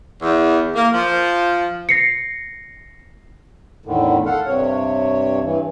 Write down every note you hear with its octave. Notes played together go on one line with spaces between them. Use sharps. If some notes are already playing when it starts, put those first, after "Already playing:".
E2
A#3
F3
A#6 C7 C#7
E2 A2 D3 D#3
A4 F5 F#5
G2 C3 C#5
G2 E3